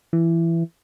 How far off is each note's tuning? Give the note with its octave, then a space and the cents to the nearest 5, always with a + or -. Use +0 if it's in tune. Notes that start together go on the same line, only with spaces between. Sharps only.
E3 +15